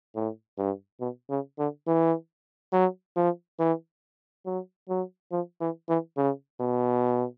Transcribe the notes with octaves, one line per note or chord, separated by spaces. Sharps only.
A2
G2
B2
C#3
D3
E3
F#3
F3
E3
F#3
F#3
F3
E3
E3
C#3
B2